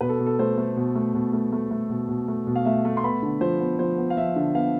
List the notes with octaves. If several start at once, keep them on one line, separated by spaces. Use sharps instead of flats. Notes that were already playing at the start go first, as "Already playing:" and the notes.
B2 B4
A4
B2
A4
A3 C5
A3
B2
A3
B2
A3
A3
A3
B2
B2
A3
B2
F5
A3 E5
A3
C6
B3 B5
D3
F3 C5
B3
F3 C5
B3
F5
F3 E5
D3
B3 F5